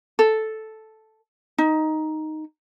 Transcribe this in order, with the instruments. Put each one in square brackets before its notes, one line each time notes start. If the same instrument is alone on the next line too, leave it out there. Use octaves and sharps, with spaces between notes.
[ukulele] A4
D#4